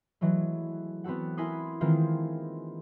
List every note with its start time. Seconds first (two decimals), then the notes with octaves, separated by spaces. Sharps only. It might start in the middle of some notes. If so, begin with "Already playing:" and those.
0.21 E3 F#3 G#3 A3
1.04 B3 C4 F#4 A4 F#5
1.37 E4 A#4 G#5 B5 C6 D#6
1.81 D#3 E3 G#3 A#3 C4 F4